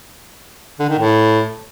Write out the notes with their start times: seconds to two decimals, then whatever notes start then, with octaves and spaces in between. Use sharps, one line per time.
0.79 D3
0.89 D#3
0.99 A2